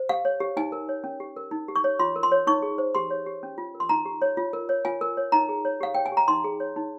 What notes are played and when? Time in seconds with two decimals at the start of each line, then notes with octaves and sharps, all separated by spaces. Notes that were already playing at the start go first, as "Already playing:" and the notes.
Already playing: C5
0.09 G4 F5
0.25 C#5
0.40 G4
0.57 D#4 G#5
0.72 A#4
0.89 C#5
1.04 C#4
1.20 G4
1.36 A#4
1.51 D#4
1.68 G4
1.76 C#6
1.84 C#5
1.99 F4 C6
2.16 A#4
2.23 C6
2.32 C#5
2.47 D#4 C#6
2.62 G#4
2.78 C5
2.95 G4 C6
3.10 C#5
3.26 G4
3.43 C#4
3.58 F4
3.75 A#4
3.80 C6
3.89 D#4 A#5
4.05 G4
4.22 C#5
4.37 F4
4.53 A#4
4.69 C#5
4.85 F4 G#5
5.01 A#4
5.17 C#5
5.32 D#4 A#5
5.49 G#4
5.65 C#5
5.81 G4 F5
5.94 C#5 G5
6.06 G#5
6.12 G4
6.17 A#5
6.28 D#4 C6
6.44 G#4
6.60 C#5
6.76 D#4